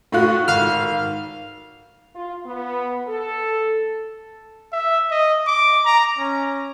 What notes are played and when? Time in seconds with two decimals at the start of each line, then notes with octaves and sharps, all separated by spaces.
0.12 A2 F4 F#4
0.48 G#1 F5 F6
2.14 F4
2.45 B3
3.08 A4
4.73 E5
5.11 D#5
5.47 D6
5.85 A#5
6.19 C#4